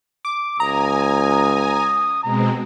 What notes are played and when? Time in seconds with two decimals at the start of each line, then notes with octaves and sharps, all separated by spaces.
0.25 D6
0.60 C#2 G#5 A#5 D#6
2.23 B2 G#3 C4 A#5